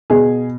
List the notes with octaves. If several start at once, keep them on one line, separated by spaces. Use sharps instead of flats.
B2 G#4